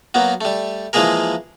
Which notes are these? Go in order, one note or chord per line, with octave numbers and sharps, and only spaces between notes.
F#3 A#3 B3
G3 A3
E3 F3 G#3 A#3 G#4 A#4